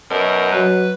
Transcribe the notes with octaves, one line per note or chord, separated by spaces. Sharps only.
F#2 B2 A#4
F#3 B4